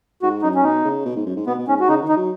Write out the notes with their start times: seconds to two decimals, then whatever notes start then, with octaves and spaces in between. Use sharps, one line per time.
0.22 G#2 F#4
0.42 F#2 D#4
0.55 C#4
0.64 B2 D#4
0.85 C#3
1.05 B2
1.16 G#2
1.26 F#2
1.36 G#2
1.47 B2 B3
1.58 B2
1.68 G#2 C#4
1.80 F#4
1.89 C#3 D#4
2.02 D#3
2.09 D#4
2.16 F#3